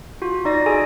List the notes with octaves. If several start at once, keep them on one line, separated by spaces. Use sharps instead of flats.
F4 F#4
D#4 D5 A#6
G#4 A4 G#5